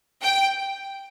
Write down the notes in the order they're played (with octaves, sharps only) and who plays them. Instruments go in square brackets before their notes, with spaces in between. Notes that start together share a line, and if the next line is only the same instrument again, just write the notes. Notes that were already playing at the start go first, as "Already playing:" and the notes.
[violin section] G5